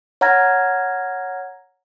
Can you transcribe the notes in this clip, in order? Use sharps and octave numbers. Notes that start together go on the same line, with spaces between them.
C#5 F#5 A#5 F6 G#6 A#6